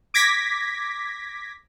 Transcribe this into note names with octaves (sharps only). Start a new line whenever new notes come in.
D6 G#6 A#6 B6